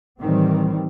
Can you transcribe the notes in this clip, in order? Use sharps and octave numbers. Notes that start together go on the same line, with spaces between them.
A2 D#3 E3 G3 C4